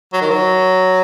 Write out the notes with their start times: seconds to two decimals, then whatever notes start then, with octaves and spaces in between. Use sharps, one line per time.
0.13 F#3
0.21 D#3
0.30 F#3